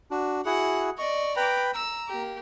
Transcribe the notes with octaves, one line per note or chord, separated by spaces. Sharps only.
D4 F#4
E4 F#4 G#4 F#5
D5 D#5 C#6
B4 G5 A#5 B5 D6
A#5 E6
A#3 G4